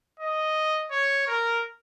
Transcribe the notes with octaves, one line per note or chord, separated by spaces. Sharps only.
D#5
C#5
A#4